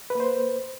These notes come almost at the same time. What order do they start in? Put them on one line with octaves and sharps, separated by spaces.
B4 A#3 C5